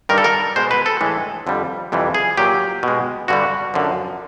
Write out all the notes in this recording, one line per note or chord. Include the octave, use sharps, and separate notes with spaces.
G2 D#3 G3 A#4
A4
A#4
B2 G#3 C5
B4
A4
A2 E3 G#3
F2 D3 G3
F2 C3 E3 G3
G#4
A#2 F#3 G4
B2 G#3
G2 D3 G3 F#4
F#2 D3 F3